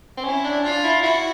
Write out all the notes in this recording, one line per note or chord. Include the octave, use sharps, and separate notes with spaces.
C4
C#4 E4
D4
C#4
D4 F4
E4
E4 F#4